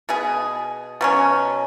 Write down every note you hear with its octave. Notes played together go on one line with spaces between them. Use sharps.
B2 B3 G#4
B2 F#3 C#4